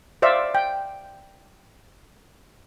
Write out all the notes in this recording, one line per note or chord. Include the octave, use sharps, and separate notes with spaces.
C5 D5 E5 F5
G5